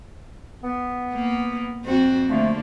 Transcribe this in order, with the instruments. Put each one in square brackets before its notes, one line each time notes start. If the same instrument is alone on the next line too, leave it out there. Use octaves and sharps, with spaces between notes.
[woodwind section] B3
[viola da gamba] A#3
F2 C4 F#4
[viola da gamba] D3 A#3 [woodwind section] F3 A3